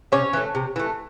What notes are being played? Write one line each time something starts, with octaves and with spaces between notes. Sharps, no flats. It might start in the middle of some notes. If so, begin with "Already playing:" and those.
C3 C#4 C#5
E3 A3
C3
E3 A3